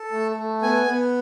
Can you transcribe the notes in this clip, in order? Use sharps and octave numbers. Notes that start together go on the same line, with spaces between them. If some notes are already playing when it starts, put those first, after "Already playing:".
Already playing: A4
A3
A3
B3 G#5
B3